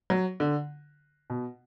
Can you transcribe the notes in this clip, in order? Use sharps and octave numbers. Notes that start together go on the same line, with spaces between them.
F#3
D3
B2